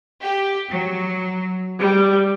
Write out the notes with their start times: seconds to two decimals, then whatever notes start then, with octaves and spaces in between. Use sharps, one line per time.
0.20 G4
0.70 F#3
1.79 G3